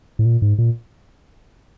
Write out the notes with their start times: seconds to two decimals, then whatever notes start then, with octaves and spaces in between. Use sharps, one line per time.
0.19 A2
0.25 A#2
0.42 G#2
0.58 A#2